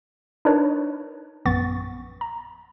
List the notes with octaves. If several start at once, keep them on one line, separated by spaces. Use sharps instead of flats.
D4 D#4 A#4 B4 C#5
A#1 F#2 B3 C#6 A6
A#5